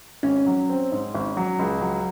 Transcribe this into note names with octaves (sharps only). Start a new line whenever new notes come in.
G#1 C#4
F#3
C4
G#2
G#1
F#3
C#2
F#3